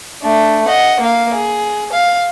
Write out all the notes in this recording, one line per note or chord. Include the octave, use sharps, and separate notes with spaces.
A3 D4
D#5 F#5
A#3 F5
G#4
F5